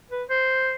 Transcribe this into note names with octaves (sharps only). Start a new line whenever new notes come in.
B4
C5